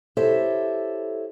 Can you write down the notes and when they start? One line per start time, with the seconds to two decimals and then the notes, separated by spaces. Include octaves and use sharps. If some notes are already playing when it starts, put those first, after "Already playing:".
0.17 E4 G4 A4 C5 C#5 E5